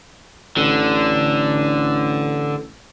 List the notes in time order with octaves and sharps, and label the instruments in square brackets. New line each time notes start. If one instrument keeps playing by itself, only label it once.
[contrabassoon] A1 [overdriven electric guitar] D3